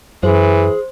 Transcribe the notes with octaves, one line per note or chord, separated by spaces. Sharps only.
F#2 E3 G#4 C5